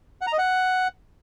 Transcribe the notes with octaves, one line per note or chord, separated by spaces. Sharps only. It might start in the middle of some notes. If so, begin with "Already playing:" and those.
F#5
A#5
D#5
F#5